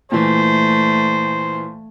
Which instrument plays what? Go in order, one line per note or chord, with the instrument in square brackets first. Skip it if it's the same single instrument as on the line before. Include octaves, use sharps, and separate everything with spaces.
[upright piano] A#2 E3 [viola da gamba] A3 [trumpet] C5